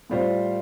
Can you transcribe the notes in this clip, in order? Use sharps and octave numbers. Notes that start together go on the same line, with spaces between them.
A2 G3 F4 C5